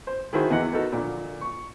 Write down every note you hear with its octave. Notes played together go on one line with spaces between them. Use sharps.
C5
D#3 E4 F#4 G#4 C5
E2 E3 D#5 F#5
B3 D#4 F#4 A4 A#4
A#2 D3 F3
C#6